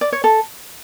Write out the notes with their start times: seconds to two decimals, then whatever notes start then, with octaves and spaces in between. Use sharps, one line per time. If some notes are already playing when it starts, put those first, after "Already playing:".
0.01 D5
0.12 C#5
0.24 A4